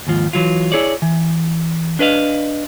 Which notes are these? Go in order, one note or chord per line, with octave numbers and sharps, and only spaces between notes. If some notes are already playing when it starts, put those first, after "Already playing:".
D#2 G#2 F3
E3 F#3 F4
E4 G#4 C#5 D5
E3
D4 B4 D#5 F5